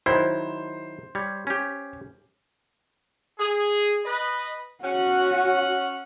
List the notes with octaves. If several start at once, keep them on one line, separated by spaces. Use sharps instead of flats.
D#3 F#3 E4 C5
G3 C#5
C#4 G4
G#4
B4 D#5 B5
C#4 F#4 F#5